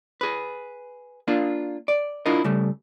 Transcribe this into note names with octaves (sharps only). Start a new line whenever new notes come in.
G#4 B4
A#3 D4 F4
D5
D4 E4 F4 A#4 D#5
C#3 G3 A3